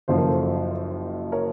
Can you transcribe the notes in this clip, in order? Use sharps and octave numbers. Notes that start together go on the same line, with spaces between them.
F#1 F#2 F3 C5
A#4
A4 C5
A#4 C#5